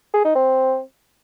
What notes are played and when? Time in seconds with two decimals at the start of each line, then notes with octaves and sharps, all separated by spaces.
0.14 G#4
0.25 D#4
0.35 C4